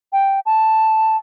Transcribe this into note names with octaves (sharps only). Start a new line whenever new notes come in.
G5
A5